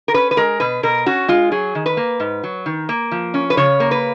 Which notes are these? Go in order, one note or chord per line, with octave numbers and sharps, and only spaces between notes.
A#4
C#4 B4
B4
G#3 A#4
B2 B4
B2 A#4
C#4 F#4
G#3 F4
F#3 G#4
D#3
B4
A#3
G#2
F#3
D#3
A#3
F3
C#4
B4
C#3 C#5
A#3
B4